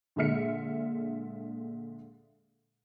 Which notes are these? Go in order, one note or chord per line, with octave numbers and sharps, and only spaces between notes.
A#2 D3 G#3 E5 F6 C#7